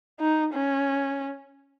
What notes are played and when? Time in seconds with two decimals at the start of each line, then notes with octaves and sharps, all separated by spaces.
0.20 D#4
0.53 C#4